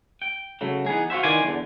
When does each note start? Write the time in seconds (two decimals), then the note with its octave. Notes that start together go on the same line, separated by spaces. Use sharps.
0.22 G5
0.61 C#3 F#3 A3
0.86 E3 B3 D#4 G#4
1.10 F4 F#4 C5 E5
1.23 D#3 E3 D5 G#5 C6
1.44 E2 D3